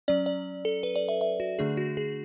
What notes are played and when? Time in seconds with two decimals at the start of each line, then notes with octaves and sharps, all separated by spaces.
0.08 F#3 C#4 D5
0.26 D5
0.65 A4
0.83 B4
0.96 D5
1.09 E5
1.21 E5
1.40 F#4
1.59 D3 A3 D4 G#4
1.77 F#4
1.97 G#4